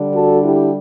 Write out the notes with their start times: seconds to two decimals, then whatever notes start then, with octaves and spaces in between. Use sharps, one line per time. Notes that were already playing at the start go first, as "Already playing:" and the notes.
Already playing: D3 G3 D4
0.13 F#4 A4
0.43 E4 G4